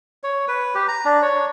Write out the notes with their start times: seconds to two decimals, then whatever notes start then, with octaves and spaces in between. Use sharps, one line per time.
0.23 C#5
0.48 B4
0.75 G4
0.88 A#5
1.05 D4
1.22 C#5